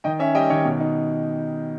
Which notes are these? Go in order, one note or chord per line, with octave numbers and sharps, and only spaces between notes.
D#3 D#5 G5
C#4 E5 G#5
G3 D#5 G5
D#3 C#5 E5
B2
D#4